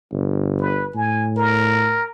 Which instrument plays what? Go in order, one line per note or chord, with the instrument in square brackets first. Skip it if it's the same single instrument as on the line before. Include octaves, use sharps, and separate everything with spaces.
[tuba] G1
[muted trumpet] B4
[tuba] A2 [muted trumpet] G#5
[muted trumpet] A#4